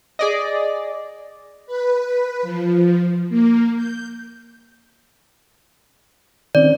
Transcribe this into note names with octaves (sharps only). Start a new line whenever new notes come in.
G#4 D5 D#5
B4
F3
A#3
G6
D#3 C4 C#4 D5